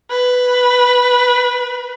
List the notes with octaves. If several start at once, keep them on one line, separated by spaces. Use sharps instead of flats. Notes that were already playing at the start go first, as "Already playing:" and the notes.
B4